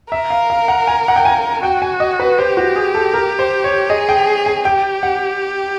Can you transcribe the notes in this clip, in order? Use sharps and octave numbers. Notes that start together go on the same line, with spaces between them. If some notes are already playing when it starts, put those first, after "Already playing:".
A#4 E5
F5
F5
F#5
G#5
F#5
G5
G#5
F#4 G5
G#5
D#5
B4
G4 C5
F#4
G#4
A4
A#4
C5
C#5
G#4 D#5
G5
G#5
G4 G5
F#5